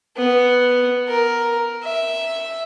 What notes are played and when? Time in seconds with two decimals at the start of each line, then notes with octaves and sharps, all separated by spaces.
0.17 B3
1.08 A#4
1.83 E5